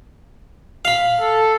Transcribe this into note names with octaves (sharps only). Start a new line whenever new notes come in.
F5 B5
A4